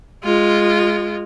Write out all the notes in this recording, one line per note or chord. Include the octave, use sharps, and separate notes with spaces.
G#3 F4